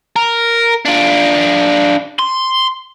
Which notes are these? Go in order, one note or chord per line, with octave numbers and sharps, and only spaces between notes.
A#4
D4 F4
C6